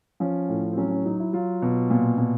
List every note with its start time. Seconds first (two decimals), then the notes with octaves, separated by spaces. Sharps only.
0.20 F3 C#4
0.49 A2
0.73 C4
0.77 F#3 C#4
0.91 C#4
1.06 F#3 D#4
1.20 E4
1.33 F#3 F4
1.62 B2
1.90 A#2
2.18 A#2